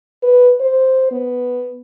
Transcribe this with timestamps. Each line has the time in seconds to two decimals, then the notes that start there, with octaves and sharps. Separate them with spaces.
0.23 B4
0.60 C5
1.11 B3